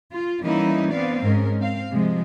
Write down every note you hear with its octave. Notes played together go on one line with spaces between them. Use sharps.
F4
E3 G3 A#3 C#4 D#4 E4
B3 C4 D4 D5 F5
G#2 G#3 C#4 A#4
C4 F5
C3 F3 G#3